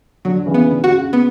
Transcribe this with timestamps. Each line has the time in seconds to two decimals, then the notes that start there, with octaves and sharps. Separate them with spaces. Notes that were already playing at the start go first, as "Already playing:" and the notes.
0.25 D3 F#3
0.46 C#3 E3
0.54 B3
0.69 D3
0.80 D3 F#4
0.90 C#3
1.13 B3